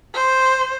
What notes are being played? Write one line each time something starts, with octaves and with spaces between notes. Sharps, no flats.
C5